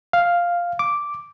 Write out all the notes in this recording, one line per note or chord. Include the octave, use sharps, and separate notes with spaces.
F5
D6